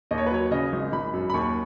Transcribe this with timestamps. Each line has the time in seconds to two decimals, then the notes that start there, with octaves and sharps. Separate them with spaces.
0.11 D#2 D#5
0.18 C#5
0.26 B4
0.31 F#3 C#5
0.51 C#3 D#5
0.73 G#1
0.92 G#1 B5
1.13 F#2
1.30 B5
1.34 D#2 C#6